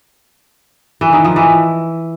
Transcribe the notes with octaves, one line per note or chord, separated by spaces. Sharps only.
E3
D#3
F3
E3